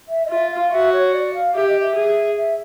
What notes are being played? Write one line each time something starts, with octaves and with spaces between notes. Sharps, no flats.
E5
D#5
F4 E5
F5
F#4 E5
C#5
D5
F5
G4 E5
D#5
E5
G#4
E5